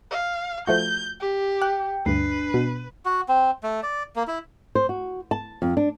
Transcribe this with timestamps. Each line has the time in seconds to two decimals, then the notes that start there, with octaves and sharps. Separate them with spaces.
0.11 F5
0.67 F3 A3 F#4 G6
1.21 G4
1.62 G5 F#6
2.06 D2 G2 D4 B4 C7
2.54 B2
3.05 F#4
3.29 C4
3.63 A3
3.83 D5
4.16 A#3
4.27 E4
4.75 C5
4.89 F#4
5.31 A5
5.62 F2
5.77 D4